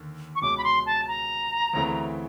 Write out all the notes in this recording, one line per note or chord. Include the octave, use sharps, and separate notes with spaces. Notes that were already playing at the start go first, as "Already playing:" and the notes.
Already playing: D#2 D3
C#6
C#2 B2 G#3 C#4 D6
B5
C6
A5
A#5
D2 C#3 E3 A3 C4